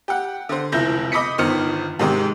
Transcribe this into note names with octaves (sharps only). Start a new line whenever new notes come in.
G4 F#5
D3 C5
F1 C#2 E4 G6 A#6
D#5 B5 D6 D#6 B6 C#7
G1 D#3 B3 C5 F6 C#7
G#2 C3 D#3 G#3 C4 G4